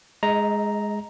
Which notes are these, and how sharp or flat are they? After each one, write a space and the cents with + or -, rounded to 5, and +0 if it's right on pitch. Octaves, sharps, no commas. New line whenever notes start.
G#3 +0 D#5 +35 A#5 +0